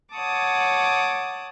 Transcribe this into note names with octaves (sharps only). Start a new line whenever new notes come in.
C#5 F#5 A5 D6 D#6